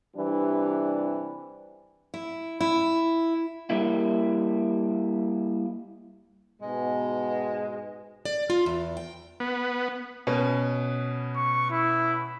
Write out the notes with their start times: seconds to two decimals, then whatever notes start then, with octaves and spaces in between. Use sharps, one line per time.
0.15 C3 E3 G3 D4
2.14 E4
2.61 E4
3.70 G3 A#3 E4
6.62 G#2 B2 G#3
8.25 D5
8.50 F4
8.66 E2
8.97 G5
9.40 B3
10.27 B2 C#4 B4
11.36 C#6
11.70 E4